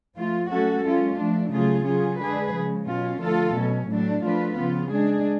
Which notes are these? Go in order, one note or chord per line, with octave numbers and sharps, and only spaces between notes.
F3 A3 F4
F#3 A3 C#4 F#4 A4
G#3 C#4 F4
F3 A3 D4
C#3 F#3 A3 F4 G#4
C#3 F#3 C#4 F4 G#4
D3 G#3 D4 G#4 B4
C#3 F3 G#3
B2 F#3 C#4 F4
D3 F3 A3 F4 A4
B2 F#3 C#4
A2 F#3 A3 D4
F3 A3 D4 F4 B4
C#3 F3 B3 F4
G#3 D4 G#4